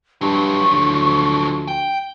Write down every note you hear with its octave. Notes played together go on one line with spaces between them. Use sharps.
G2 F3 F#3 C#6
D2
G5